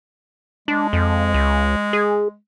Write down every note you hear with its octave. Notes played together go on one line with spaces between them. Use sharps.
G#3 D4
F2
C#2
G#4